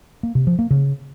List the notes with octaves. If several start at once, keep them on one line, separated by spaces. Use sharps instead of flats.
A#3
C3
F3
A#3
C#3